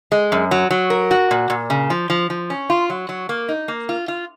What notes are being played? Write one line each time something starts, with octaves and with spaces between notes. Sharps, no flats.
G#3
F#2
F#3
F#3
A#4
F#4
A#2
A#2
C#3
F3
F3
F3
C#4
F4
F#3
F#3
A#3
D#4
A#3
F4
F4